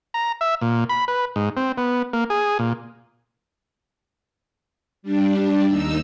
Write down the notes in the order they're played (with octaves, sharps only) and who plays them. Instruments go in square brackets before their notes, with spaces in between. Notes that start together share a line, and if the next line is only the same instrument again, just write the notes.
[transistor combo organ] A#5
E5
A#2
B5
B4
G#2
C4
B3
A#3
G#4
A#2
[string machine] G3 D4
D#2 D#4 E6